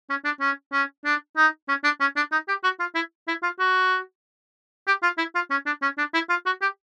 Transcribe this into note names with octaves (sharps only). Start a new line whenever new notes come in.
C#4
D4
C#4
C#4
D4
D#4
C#4
D4
C#4
D4
D#4
G4
F#4
F4
E4
E4
F4
F#4
G4
F4
E4
F4
C#4
D4
C#4
D4
E4
F4
F#4
G4